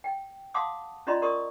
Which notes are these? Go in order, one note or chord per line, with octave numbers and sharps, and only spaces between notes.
G5
F5 F#5 A5 C6 D6 D#6
C#4 F4 D5 D#5 A#5 C6
A#4 D5 C6 C#6 D#6